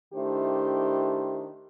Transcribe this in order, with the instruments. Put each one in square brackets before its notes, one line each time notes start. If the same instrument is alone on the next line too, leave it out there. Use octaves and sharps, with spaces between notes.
[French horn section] D#3 A3 D4 E4 G4 C5